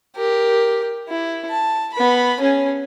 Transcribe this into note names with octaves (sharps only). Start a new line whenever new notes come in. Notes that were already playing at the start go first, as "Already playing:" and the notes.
G4 A#4
E4
A5
B3 B5
C#4 G#4